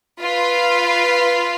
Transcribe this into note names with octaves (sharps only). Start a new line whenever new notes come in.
F4 B4 F5